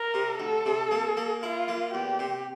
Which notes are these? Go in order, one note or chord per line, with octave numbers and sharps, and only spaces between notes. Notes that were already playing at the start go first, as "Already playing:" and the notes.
Already playing: A#4
C3
D2 A4
C3
A#3
A#3
E4 F4
A#3
E2 G4
C3